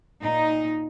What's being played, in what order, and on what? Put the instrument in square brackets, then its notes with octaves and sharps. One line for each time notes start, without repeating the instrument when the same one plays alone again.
[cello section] A#2 D#4